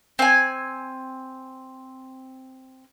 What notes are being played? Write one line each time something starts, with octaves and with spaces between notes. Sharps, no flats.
C4 G#5